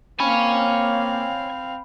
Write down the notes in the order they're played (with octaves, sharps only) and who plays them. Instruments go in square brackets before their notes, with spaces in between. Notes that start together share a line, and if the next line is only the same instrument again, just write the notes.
[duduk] A#3 [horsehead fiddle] C4 F5 [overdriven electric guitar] C#5 G#5 [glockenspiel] B5